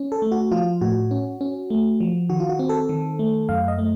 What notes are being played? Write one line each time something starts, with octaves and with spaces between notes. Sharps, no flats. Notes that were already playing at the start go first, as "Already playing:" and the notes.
Already playing: C#4
A4
A3
F#4
F3 F4
A2 F#4
C#4
C#4
A3
F3
D#3 F#4
F4
F#4
C4
A4
D#3
A3
F#2 F5
D#5
A3